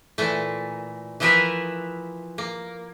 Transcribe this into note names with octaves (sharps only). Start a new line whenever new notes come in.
A#2 E3 A3
E3 F3 E4 A#4 B4 E5
A#3